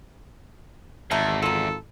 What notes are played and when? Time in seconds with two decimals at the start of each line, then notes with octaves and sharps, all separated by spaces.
1.11 G#1 E2 A3 D#4 F4
1.42 D#4 F4 A4